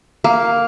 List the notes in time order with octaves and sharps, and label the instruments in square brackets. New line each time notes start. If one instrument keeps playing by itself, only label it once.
[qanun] A#3